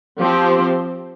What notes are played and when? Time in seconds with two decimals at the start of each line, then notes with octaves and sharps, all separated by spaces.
0.19 F3 C4 G4 C5